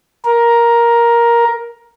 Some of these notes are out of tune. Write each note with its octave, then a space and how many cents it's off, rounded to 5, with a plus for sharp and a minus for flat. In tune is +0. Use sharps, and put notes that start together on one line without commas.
A#4 +10